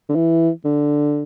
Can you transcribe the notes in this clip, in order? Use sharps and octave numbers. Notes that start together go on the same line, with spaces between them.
D3
E3
D3